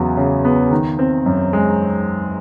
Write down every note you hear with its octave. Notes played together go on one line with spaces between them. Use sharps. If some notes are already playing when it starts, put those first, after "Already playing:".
Already playing: E2 C#3 F#3 B3
C#3
B3
D#3
C4
F#2
G#3